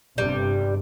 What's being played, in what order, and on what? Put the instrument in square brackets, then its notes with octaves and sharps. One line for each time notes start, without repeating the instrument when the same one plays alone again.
[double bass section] G1 G2 C3 [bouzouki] G3